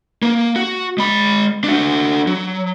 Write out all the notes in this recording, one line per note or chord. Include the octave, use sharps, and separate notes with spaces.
A#3
F#4
G#3 B5
D4 F#4
F#3